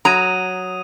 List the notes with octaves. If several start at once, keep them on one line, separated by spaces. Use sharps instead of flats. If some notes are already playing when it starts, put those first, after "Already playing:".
F#3 A#5 D#6 G#6 D#7